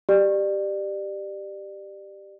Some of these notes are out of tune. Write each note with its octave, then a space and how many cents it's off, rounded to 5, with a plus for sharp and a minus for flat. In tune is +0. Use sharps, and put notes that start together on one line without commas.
G4 +0 D5 +25